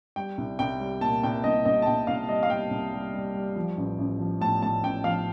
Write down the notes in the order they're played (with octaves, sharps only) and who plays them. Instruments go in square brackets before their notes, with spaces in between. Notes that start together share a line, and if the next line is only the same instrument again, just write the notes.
[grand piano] G3 G5
C2
C2 G5
G3
A#2 A5
C2 G5
C2 D#5
C2 D#5
A5
C2 G5
C2 F5
G3 D#5
F5
G3 G5
C2
G3
G3
G3
F3
A1
A1
F3
A2 A5
A2 A5
A1 G5
F3 F5